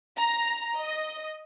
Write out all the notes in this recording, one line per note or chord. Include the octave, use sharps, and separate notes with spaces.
A#5
D#5